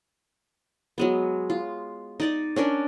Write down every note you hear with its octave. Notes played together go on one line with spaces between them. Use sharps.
F#3 G#3 B3
F4
D#4 D5 D#5
C#4 D4 A#4 D5